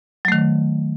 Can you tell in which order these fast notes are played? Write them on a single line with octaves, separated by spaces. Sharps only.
F#3 A3 D#3